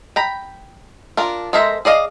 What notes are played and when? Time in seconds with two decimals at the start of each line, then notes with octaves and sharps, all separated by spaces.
0.16 G5 A#5 B5
1.17 D4 F4 A#4
1.53 G#3 A4 A#4 C5 E5
1.85 G#4 D5 D#5 F5